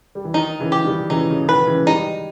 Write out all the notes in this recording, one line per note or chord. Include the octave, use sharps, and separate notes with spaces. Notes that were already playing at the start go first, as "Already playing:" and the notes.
G3
E3
D#3 D#4
C#3 E3
G4
D#3 G3
C#3 E3 D#4
C#3
D#3 B4
C#3 E3
G#3
D#3 G3 D#4